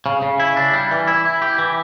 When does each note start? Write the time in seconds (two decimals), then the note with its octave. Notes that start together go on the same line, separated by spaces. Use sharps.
0.06 C#3
0.22 C#3
0.40 E4
0.57 D4
0.74 G3
0.91 E3
1.07 E4
1.25 E4
1.42 G4
1.59 E3